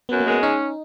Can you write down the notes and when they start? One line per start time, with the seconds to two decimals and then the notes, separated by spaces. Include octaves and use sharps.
0.09 F#2 B3
0.20 A#3
0.27 G#3 B3
0.43 C#4 D#4